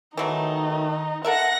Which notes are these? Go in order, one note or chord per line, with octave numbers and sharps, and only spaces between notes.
D#3 E3 F#3 A3 D#4
A4 A#4 E5 F#5 A#6